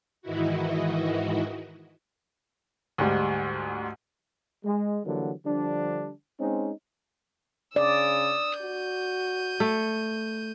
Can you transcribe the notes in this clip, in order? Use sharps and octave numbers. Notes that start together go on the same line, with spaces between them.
G#2 D#3 E3 D#4 E4 F#4
D2 G#2 G3
G#3
D3 E3 F#3 G3 A#3
D3 F3 G3 D4
G#3 C4 C#4 D#4
C#3 D5 D#6 E6
F#4 G6 D#7
A3